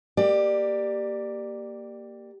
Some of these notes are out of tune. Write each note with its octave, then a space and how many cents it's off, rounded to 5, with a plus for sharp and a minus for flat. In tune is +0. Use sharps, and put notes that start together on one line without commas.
A#3 +0 G4 +0 D5 +20